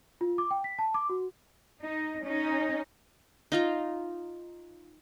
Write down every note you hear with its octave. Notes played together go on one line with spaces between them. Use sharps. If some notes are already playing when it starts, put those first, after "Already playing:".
F4
D6
G5
B6
A5
D6
F#4
D#4
C#4 D#4
D#4 F4 A#5